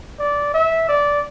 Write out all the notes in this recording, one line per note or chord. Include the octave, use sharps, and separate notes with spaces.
D5
E5
D5